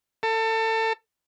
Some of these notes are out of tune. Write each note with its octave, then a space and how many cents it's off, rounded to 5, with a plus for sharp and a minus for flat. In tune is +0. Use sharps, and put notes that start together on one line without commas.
A4 +25